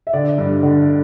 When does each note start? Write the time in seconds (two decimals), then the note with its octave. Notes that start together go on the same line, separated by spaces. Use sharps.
0.07 E5
0.13 D3 D5
0.38 G2
0.63 D3